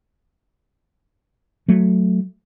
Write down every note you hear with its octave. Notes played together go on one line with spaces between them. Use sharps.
F#3 A3